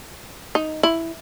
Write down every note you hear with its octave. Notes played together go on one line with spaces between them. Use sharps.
D#4
E4